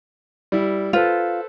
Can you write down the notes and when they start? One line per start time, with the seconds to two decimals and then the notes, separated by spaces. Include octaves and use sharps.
0.52 G3 E4
0.93 F4 A4 B4 C5